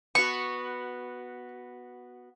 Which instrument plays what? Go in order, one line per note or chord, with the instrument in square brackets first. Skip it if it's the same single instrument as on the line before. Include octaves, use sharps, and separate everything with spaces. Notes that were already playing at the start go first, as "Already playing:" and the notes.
[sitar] B3 F#4 [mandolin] C#6